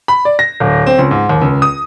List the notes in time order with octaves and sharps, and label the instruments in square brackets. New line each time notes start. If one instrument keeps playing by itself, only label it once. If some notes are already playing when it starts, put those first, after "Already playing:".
[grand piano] B5
D5
A#6
D1
C4
C#2
G#2
D#2
C#2
D#6